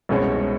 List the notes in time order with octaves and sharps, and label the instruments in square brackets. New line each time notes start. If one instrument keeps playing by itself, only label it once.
[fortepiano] C2 B2 G#3 C#4